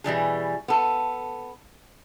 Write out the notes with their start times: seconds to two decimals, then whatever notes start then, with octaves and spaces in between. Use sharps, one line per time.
0.04 B2 E3 G3 G#4
0.68 B3 A4